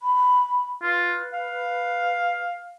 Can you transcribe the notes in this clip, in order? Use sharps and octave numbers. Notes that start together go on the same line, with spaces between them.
B5
F4 B4
F5